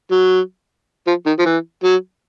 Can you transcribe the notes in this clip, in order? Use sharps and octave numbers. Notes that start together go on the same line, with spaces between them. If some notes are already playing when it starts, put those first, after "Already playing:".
F#3
F3
D#3
F3
E3
F#3